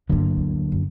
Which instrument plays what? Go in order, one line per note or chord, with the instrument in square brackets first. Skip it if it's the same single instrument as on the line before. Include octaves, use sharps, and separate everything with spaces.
[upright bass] G2 A3 [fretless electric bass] D3 F#3 A#3
[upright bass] D2
F#2